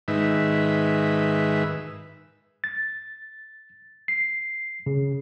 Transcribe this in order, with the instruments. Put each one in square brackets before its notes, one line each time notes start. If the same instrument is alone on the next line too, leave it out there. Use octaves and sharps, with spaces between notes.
[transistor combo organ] G#2 D#3 B4 E5
[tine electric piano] A6
C7
C#3